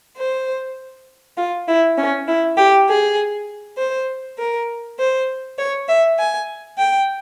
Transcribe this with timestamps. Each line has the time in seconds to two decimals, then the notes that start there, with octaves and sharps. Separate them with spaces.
0.17 C5
1.37 F4
1.68 E4
1.98 C#4
2.27 E4
2.57 G4
2.88 G#4
3.77 C5
4.38 A#4
4.99 C5
5.59 C#5
5.88 E5
6.18 G#5
6.78 G5